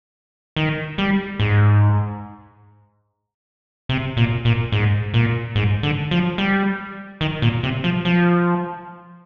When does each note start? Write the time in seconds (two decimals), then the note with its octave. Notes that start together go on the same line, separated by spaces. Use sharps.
0.56 D#3
0.98 G3
1.40 G#2
3.89 C3
4.17 A#2
4.45 A#2
4.72 G#2
5.14 A#2
5.55 G#2
5.83 D3
6.11 F3
6.38 G3
7.21 D#3
7.42 A#2
7.63 C3
7.84 F3
8.05 F3